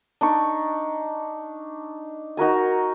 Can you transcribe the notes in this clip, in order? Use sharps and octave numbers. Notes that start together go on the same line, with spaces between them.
D4 D#4 C#6
D#4 F#4 A#4 G#5